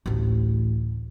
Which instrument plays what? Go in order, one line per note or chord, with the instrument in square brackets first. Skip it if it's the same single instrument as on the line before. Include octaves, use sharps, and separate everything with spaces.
[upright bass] A1 D2